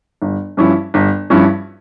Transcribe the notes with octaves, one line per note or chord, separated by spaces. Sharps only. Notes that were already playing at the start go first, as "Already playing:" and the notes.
G1
G2 F3 C#4 E4
G1
G2 F3 C#4 E4